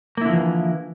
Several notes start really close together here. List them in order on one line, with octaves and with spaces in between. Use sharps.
A#3 E4 D3 F3 E3